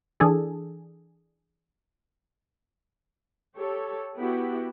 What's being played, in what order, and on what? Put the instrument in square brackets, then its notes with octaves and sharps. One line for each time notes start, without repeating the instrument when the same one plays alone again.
[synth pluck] E3 D4 G#4 A4
[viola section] G4 A4 C#5
B3 E4 F#4 G4